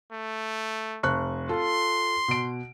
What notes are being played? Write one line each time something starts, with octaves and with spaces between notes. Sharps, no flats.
A3
F1 C#6 F#6
F4 A4 C6
B2 D7